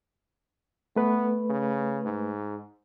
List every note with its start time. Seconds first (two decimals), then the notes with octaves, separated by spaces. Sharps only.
0.96 A3 B3 B4
1.50 C#3
2.05 G#2